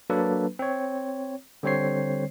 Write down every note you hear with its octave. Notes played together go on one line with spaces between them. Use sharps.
F#3 A#3 D4 A4 B4
C4 C#5
D3 G3 C4 C5 C#5 C7